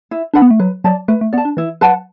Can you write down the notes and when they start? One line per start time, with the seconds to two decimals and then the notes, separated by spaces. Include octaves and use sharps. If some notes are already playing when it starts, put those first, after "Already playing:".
0.11 E4
0.34 D4 B4 F#5 B5
0.42 B3
0.51 A3
0.59 F#3 B4
0.84 F#3 D5 A5
1.08 A3 B4
1.21 A3
1.33 B3 D5
1.37 A5
1.45 D4
1.57 E3 E4
1.81 F#3 B4 F#5 A5